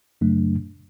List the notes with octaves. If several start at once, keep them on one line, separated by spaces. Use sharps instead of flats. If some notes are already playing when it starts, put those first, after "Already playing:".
F#2 C#3 F#3 A3 D4